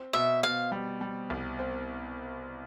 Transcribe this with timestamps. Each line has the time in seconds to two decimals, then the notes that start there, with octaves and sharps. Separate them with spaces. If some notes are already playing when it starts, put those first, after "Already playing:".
Already playing: C4
0.13 B2 E5
0.43 B2 F5
0.72 G3
1.01 G3
1.30 C2
1.59 C4